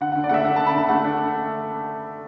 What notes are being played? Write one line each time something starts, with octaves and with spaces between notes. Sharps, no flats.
D3 F#5
F#5
D3
D5
A3 E5 F#5
D4 F#5
A5
D3
B5
D3 A5
A3 F#5
D4